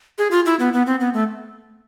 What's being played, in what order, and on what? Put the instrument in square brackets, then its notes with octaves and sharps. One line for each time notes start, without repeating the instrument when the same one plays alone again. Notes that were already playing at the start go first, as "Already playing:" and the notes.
[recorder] G#4
F4
E4
B3
B3
C4
B3
A3